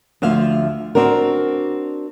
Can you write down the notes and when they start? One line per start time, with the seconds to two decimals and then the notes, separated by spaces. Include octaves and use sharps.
0.22 D2 F3 E5 F5
0.95 C4 D4 F#4 A#4